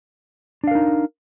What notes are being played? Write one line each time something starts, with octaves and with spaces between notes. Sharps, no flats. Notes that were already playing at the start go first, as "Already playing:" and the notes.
D4 D#4 A#4 F5